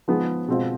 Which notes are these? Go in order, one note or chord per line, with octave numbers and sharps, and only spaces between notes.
F3 G#3 B3 D#4 G#4
B2 G#3 C4 F4